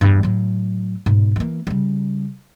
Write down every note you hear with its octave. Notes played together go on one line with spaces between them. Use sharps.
E2 G2
A2 F#3
G#2 B2
E3 A#3
C#3 G3